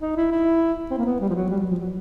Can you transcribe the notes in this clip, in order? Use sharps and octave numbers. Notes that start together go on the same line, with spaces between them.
D#4
E4
E4
C4
A#3
B3
G3
F3
F#3
G3
F#3
F3
F#3